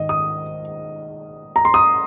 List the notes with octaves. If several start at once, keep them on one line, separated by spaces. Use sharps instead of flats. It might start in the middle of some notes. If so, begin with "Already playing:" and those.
Already playing: G#2 D#3 D#5
D#6
A#5
C6
D#6